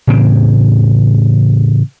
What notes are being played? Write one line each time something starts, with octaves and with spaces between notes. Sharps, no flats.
A2 C#3 E3 C4